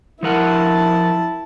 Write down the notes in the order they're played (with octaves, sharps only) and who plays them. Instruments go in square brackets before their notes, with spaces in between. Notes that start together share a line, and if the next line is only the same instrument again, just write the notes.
[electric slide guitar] F3 A#4 F#5 [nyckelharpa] E4 A5